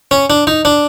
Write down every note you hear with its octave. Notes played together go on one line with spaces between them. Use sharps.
C#4
D4
D#4
D4